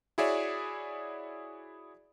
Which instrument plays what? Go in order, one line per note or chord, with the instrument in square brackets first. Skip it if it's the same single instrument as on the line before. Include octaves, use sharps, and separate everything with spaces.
[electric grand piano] E4 F#4 G#4 C#5 D5 E5